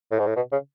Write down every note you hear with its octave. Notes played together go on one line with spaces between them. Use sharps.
A2
G#2
A2
B2
C#3